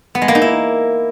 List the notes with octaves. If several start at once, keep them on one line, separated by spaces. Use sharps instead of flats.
B3
G#3
A#3
D#4
E4